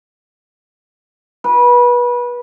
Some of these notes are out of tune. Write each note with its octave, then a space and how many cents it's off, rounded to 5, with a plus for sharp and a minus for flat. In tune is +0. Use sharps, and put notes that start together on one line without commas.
B4 -25